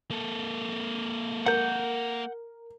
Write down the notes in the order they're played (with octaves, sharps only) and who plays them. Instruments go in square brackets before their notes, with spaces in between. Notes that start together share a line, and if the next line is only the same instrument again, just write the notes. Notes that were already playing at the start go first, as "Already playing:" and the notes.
[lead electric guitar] A#3 A4
[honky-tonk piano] A#4 [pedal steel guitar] F#5 G6